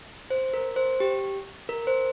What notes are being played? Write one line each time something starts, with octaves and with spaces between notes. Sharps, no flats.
C5
A#4
C5
G4
A#4
C5